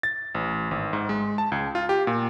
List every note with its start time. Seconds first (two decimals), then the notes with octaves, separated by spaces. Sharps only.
0.03 A6
0.35 A1
0.71 G#1
0.93 G#2
1.09 G#3
1.38 A5
1.52 C#2
1.75 F4
1.89 G4
2.07 A#2